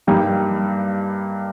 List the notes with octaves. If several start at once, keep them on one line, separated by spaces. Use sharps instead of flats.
G2 G3 A#3 D#4 G4